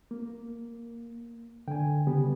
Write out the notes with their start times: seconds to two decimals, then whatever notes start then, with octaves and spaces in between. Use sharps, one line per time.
0.11 A#3
1.68 D3 G5 G#5
2.07 C#3 G3 B3 G4